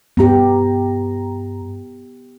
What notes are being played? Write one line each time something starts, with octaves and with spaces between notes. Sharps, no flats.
G2 B3 G4 A#5